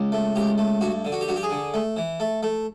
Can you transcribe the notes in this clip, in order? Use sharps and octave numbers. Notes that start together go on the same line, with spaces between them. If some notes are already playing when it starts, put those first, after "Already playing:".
Already playing: C#2
A3
C#2 G4
A3
G2 F#4
D3
F#4
G4
G2 F#4
G4
G#4
D3
A3
E3
A3
A3